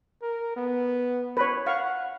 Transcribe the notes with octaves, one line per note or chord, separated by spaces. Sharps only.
A#4
B3
B4 C#5
F5 F#5 C#6